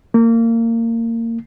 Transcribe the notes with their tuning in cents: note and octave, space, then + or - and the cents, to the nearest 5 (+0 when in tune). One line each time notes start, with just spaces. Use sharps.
A#3 -25